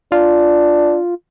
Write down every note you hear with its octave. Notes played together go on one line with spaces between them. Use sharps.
D4 F4